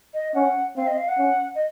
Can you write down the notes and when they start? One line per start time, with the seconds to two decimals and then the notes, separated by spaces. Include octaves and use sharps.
0.14 D#5
0.34 C#4 F#5
0.76 C4 F5
0.87 D#5
0.97 F5
1.08 F#5
1.18 C#4
1.55 D#5